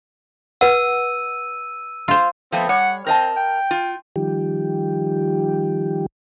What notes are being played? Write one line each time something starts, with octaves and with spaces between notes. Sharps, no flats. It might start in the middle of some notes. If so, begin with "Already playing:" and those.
B4 F#5 E6 D#7
F4 C5
F3 A3 B3 C4
G3 C#5 F#5
C4 A#4 D#5 A5
G5
F4
D#3 F3 G3 G4